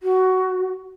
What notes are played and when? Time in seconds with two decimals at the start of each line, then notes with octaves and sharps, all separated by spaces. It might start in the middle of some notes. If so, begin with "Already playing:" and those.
0.03 F#4